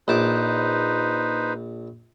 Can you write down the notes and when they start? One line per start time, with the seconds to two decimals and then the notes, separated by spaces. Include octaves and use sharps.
0.08 A#1 D#4 B4 C5 A5 D6